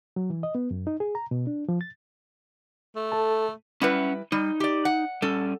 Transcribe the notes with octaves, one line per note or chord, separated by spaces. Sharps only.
F#3
E3
D#5
B3
F#2
D#4
G#4
A#5
B2
D4
F3
A6
A3
A4 A5
G3 C#4 E4 B4 F#5
G3 D#4
G4 D5
F#5
G3 C#4 A4